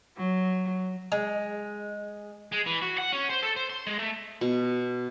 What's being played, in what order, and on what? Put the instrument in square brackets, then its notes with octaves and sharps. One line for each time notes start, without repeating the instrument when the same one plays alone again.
[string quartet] F#3
[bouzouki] G#3
[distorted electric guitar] G#3
E3
F#4
F#5
C#4
C5
A4
C5
C6
G#3
A3
[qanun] B2